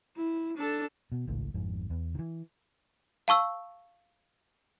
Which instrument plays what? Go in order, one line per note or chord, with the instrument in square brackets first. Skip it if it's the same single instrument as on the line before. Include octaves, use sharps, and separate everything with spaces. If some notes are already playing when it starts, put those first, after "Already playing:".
[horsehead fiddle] E4
D4 A4
[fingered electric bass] B2
G#1 C#2 A2
G#1 F2 G#2
E2
D#3 E3
[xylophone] F5 A5 C#6 E6